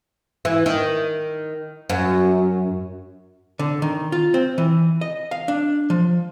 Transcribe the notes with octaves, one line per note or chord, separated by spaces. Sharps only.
E3
D#3
F#2
D3
D#3
F4
C4
E3
D#5
F5
D4
F3